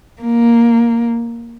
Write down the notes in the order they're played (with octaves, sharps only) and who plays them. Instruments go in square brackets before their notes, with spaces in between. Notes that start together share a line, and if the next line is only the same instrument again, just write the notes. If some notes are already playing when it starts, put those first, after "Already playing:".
[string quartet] A#3